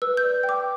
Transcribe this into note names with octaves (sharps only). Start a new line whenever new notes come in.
B4 E6
G6
D5
G5
D6